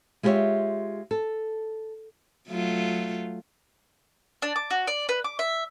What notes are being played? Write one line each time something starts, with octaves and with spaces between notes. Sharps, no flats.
G#3 F4 G4 A#4 C#5 E5
A4
F#3 A3 F4
D4
D6
F#4
D5
B4
D6
E5